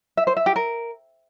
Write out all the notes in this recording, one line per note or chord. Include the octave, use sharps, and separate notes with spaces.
E5
C5
E5
G4
A#4